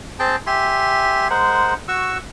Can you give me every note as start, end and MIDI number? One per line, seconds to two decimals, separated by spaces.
0.19 0.36 60
0.19 0.36 68
0.19 0.36 79
0.19 0.36 81
0.47 1.28 67
0.47 1.28 76
0.47 1.28 80
0.47 1.28 84
1.30 1.74 56
1.30 1.74 70
1.30 1.74 72
1.30 1.74 78
1.88 2.18 66
1.88 2.18 85
1.88 2.18 88